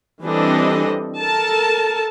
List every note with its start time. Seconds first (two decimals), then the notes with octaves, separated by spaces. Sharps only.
0.23 E3 G3 C4 D4 A4 D#5
1.18 A4 A#4 A5